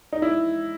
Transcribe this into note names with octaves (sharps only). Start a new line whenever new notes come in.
D#4
E4